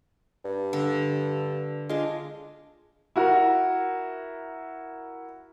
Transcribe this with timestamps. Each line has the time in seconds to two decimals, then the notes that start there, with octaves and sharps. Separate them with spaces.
0.45 G2
0.73 D3
1.89 G#3 D4 F4
3.16 E4 F#4 A#4